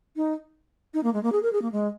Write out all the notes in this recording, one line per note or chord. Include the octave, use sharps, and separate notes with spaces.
D#4
D#4
A#3
G#3
A#3
G#4
A#4
G#4
A#3
G#3